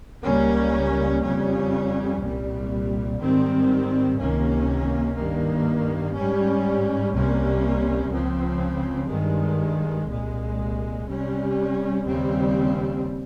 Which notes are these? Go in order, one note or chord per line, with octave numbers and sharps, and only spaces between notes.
C#2 C#3 G3 A#3 C#4
F2 C#3 G3 C#4
C2 A#2 G3
G#2 D#3 G3 C4
C#2 C3 D#3 A#3 C#4
G2 D#3 A#3
G#2 G3 C#4
C2 C3 G3 A#3 C#4
C#2 C#3 F3 C4
G2 D#3 G#3
C2 A#2 G#3
C3 G3 C#4
D#2 C#3 G3 C4